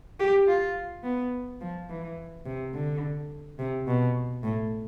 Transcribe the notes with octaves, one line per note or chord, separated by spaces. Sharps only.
G4
F4
B3
F3
E3
C3
D3
C3
B2
A2